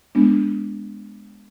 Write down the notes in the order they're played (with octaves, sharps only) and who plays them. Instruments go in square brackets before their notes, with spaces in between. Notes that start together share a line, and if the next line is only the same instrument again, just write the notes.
[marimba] G#3 B3 D4